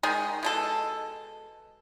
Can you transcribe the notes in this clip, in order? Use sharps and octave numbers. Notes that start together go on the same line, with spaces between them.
D#3 G#3
B2 G#3 A4